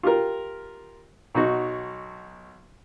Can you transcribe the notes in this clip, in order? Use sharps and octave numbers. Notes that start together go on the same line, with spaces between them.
F4 G4 A#4
B1 D#4 F#4